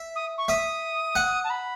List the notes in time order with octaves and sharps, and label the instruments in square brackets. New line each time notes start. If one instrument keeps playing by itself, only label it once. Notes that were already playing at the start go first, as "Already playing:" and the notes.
Already playing: [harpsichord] E5
[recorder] D#6
C#6
[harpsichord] E5 [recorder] D#6
[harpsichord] F#5
[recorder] A5
B5